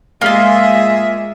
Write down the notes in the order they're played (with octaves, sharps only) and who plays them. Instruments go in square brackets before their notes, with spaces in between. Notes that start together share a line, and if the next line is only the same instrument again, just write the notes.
[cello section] G#3 G#4 E5 [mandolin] A#3 F4